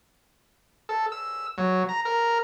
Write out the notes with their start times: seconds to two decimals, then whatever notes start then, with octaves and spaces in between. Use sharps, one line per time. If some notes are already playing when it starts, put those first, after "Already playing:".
0.89 A4
1.12 E6
1.58 F#3
1.89 A#5
2.05 A#4